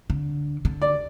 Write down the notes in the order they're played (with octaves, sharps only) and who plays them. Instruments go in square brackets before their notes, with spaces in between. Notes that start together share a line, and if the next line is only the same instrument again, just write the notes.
[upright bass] D3
D3
[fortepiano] D5